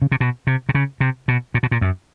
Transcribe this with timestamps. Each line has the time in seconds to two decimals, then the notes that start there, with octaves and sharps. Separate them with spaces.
0.02 C#3
0.12 C3
0.20 B2
0.47 C3
0.69 C3
0.75 C#3
1.00 C3
1.28 B2
1.54 A#2
1.63 B2
1.71 A#2
1.81 F#2